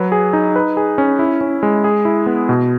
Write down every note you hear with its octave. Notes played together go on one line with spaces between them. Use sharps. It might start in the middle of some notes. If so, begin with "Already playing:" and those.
Already playing: F#3 B4
G#4
D#4
B4
G#4
C#4
E4
C#4
G#3
G#4
E4
B3
B2